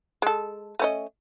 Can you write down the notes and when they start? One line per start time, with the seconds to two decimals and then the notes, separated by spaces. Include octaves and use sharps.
0.22 G#3 A4
0.79 A3 C#4 D#5